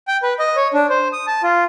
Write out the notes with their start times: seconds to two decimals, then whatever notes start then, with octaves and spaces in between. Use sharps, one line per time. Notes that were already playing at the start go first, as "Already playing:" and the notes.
0.08 G5
0.23 B4
0.39 D#5
0.56 C#5
0.74 D4
0.90 C5
1.13 D#6
1.27 A5
1.43 F4